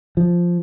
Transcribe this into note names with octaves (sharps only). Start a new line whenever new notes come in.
F3